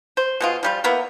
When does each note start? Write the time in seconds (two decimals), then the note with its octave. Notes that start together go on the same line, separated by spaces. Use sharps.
0.17 C5
0.41 B2 G#3 F4
0.63 F3 G3 F4
0.84 A#3 B3 E4 A#4